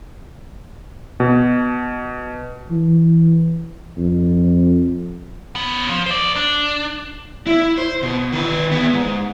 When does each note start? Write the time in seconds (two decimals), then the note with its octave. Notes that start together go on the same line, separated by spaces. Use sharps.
1.20 B2
2.71 E3
3.98 F2
5.56 B3 C#4
5.90 F3
6.06 C5 D5
6.36 D4
7.47 E4
7.78 C5
8.03 B2
8.33 D#3 B4
8.71 B3 G#4
8.93 G#2